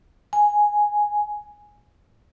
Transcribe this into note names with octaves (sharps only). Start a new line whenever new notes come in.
G#5